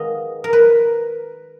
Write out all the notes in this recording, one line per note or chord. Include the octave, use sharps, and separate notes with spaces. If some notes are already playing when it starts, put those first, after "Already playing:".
Already playing: D#3 G#3 B3 D#5 F5
A#4
B4